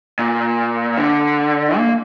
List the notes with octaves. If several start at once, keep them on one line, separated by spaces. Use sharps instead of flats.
A#2
D3
A#3